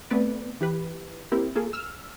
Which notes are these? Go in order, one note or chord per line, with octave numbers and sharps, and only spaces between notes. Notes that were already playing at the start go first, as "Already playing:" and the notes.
A3 B3 C4 B4 D5
E3 G4 B4
A#3 C4 E4 G4 A#4
A#3 F4 G#4 A4
E6 F6